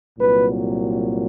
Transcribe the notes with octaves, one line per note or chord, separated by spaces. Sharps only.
C2 A#2 F#3 B4